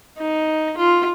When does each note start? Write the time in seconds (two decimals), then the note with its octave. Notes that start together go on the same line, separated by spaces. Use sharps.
0.18 D#4
0.78 F4